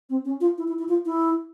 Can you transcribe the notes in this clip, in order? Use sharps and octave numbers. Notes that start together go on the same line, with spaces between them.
C4
C#4
F4
E4
E4
E4
F4
E4